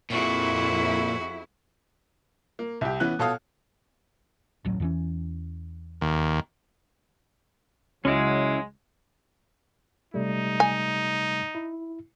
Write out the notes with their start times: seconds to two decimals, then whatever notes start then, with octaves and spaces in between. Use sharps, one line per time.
0.10 F2 A#2 E4 F#4 G#4
2.59 A#3
2.81 C2 G4
3.00 E3 B3 C#4 F#6
3.19 B2 A4 C#5 F5 D#6 F6
4.65 D1 A1 F#3
4.80 E2 E3 C#4
6.01 D#2
8.05 C#2 F#3 G#3 C#4 E4
10.14 C3 G3 A3 D#4
10.60 G#5
11.55 E4